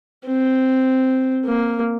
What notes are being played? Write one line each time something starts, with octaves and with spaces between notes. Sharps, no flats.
C4
A#3